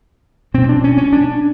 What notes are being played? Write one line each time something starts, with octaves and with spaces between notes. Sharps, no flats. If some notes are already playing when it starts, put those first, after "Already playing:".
B2 C4
D4
C#4
C#4
D4